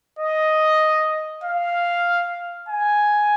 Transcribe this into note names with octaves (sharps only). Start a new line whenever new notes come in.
D#5
F5
G#5